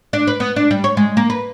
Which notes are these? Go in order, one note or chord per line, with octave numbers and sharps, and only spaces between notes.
D4
B4
B3
D4
G3
C#5
G#3
A#3
B4